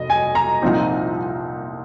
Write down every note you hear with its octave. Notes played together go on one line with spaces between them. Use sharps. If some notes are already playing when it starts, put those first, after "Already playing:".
Already playing: F1 D#5
G#5
A#5
C2 A#2 F3 C4 D#4